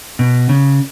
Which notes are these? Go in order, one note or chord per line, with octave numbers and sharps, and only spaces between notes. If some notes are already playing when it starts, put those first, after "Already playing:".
B2
C#3